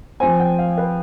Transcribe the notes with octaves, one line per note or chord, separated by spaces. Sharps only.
F3 C4 G#5
G5
F5
B4